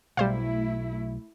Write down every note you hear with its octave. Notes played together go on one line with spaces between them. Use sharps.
B1 G3 A3 E4 C5 F5